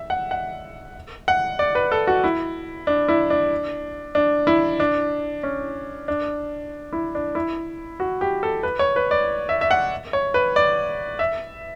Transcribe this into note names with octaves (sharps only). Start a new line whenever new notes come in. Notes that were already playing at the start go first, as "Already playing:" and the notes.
Already playing: E5
F#5
F#5
F#5
D5
B4
A4
F#4
E4
D4
E4
D4
D4
E4
D4
C#4
D4
E4
D4
E4
F#4
G4
A4
B4
C#5
B4
D5
E5
E5
F#5
C#5
B4
D5
E5